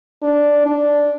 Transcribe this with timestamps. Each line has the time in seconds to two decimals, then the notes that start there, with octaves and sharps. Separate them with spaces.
0.22 D4
0.66 D4